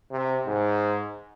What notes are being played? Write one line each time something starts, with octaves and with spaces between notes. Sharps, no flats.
C3
G#2